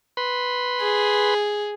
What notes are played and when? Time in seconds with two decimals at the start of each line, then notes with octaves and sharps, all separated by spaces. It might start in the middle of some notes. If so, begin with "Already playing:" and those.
0.17 B4 B5 C6
0.80 G#4